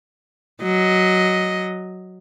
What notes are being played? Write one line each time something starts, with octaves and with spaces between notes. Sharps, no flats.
F#3 D#5